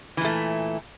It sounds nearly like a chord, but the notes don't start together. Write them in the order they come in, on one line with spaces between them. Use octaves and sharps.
E3 A#2 A3